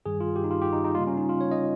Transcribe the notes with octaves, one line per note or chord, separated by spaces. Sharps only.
G2 D#3 G3 G#4
F4
G4
D#4
F4
G4
D#4
D#4
C#3 G3 A#3 F4
C#4
D#4
F4
C#5
D#5